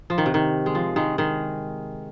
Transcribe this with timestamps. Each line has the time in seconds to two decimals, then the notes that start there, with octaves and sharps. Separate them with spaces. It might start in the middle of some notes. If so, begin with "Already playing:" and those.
0.10 F3
0.18 D#3
0.26 C3
0.34 D#3
0.66 G#3
0.75 F3
0.96 D#3 G#3
1.18 D#3 G#3